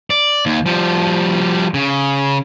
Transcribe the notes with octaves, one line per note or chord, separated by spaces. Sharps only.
D5
D#2
F3 G3
C#3